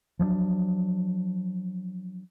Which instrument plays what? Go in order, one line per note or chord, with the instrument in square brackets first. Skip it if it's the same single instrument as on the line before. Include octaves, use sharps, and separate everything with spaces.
[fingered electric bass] F3 F#3 A#3 D4